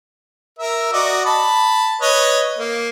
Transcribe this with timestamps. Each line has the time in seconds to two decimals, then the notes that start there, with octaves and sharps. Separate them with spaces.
0.59 A#4 E5
0.93 F#4 D5 D#5
1.26 A5 B5
2.01 B4 C#5 D#5
2.59 A#3